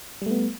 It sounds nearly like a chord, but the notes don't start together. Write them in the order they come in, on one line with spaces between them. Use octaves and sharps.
G3 A3 B3